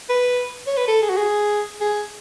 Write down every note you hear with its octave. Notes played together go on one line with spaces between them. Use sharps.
B4
C#5
B4
A4
G#4
F#4
G#4
G#4